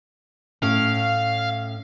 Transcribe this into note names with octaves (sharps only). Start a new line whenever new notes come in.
A2 C#4 F5